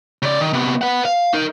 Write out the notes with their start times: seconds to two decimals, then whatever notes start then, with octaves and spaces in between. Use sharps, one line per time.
0.22 C#3 D5
0.40 D#3
0.53 C3 B3
0.81 B4 F#5
1.05 F5
1.33 D#4 A#4